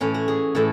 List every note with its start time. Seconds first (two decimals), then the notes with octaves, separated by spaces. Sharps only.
0.01 A2 E3 C#4
0.14 F#4
0.28 G#4
0.55 A2 E3 A4